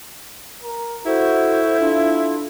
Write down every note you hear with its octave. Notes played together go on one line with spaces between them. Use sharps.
A#4
E4 F#4 A4 C5
D4 F4